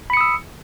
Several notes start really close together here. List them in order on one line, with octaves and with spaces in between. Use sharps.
B5 C#7 D#6 E6